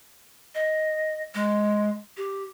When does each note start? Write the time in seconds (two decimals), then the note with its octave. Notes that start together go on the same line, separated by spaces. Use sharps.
0.55 D#5
1.35 G#3
2.17 G4